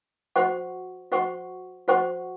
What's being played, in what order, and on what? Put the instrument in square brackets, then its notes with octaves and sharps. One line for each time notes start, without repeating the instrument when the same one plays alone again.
[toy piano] F#4 C5 F#5 C#6
F#4 C5 F#5 C#6
F#4 C5 F#5 C#6